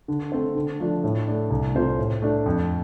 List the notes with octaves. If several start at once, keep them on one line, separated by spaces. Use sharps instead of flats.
D3
A3 C4 A4 C5
D3
F3 A3 D4
A2
A3 D4
C2
C3 A3 F4 C5
A2
A3 D4
F2